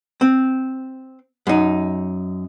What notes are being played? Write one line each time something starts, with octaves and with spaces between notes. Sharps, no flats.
C4
F#2 D#4